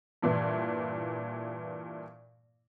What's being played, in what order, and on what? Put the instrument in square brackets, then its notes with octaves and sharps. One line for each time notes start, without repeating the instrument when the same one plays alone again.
[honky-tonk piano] G2 A#2 E3 E4